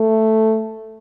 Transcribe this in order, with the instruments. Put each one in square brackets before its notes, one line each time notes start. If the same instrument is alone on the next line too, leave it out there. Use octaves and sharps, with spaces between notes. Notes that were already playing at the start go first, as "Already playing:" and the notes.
Already playing: [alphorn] A3